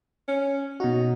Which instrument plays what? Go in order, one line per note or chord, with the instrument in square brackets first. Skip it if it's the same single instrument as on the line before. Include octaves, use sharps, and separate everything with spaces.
[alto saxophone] C#4
[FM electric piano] B2 F#4 [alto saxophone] D#4